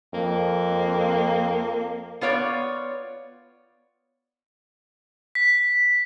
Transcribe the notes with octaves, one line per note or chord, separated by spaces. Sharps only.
F2 A#3
B3 F4 C#5 D5
B6